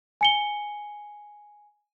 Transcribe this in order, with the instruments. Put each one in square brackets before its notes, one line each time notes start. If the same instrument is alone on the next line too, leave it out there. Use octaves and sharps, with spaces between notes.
[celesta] G#5 C#7 G7